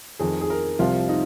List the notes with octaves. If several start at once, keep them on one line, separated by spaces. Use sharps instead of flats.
F2 D#3 G#4
G#4
A#4
C2 C3 F3 F4
D#4